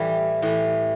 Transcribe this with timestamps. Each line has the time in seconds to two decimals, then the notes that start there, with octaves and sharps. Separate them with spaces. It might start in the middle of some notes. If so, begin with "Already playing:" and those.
Already playing: A2 E3 G3
0.42 A2 E3 G3